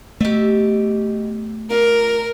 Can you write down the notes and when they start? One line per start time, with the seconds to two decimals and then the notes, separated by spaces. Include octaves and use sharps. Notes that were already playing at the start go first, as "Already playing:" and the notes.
0.21 B2 A3 G4 E5
1.70 F4 A#4 D5